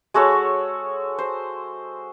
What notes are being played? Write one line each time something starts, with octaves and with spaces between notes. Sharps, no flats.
G#3 F#4 A4 C#5
C5